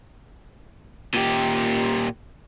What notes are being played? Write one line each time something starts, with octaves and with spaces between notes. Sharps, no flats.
A#2 G4